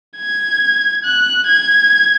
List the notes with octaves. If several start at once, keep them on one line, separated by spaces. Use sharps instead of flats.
G#6
F#6
G#6